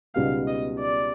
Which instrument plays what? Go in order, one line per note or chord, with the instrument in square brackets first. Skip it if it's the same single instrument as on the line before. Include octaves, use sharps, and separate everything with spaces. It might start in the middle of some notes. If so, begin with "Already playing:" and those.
[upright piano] C#2 B2 G3 B3 D#4 [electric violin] F5
[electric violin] D#5
D5